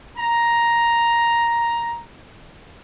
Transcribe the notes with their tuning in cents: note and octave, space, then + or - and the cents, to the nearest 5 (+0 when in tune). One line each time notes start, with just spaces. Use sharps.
A#5 +5